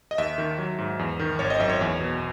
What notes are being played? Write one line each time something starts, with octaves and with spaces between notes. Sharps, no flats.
D#5
D#2 E5
D#3
F#3
G#2
E2
D#3
G#1 C#5
D#5
F#2 E5
C#5
E2
B2